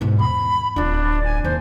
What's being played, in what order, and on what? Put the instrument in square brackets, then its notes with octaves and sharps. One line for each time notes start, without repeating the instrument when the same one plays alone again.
[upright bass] G#2 B2
[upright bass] E2 [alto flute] B5
[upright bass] D1 F4 [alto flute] D4
[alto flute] G#5
[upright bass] D#2 [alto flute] C5